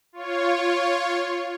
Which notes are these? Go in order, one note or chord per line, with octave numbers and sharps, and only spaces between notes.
F4 C#5